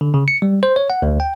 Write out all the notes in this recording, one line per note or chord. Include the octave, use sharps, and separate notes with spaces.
D3
C#3
C#7
G3
C5
C#5
F#5
D2
G5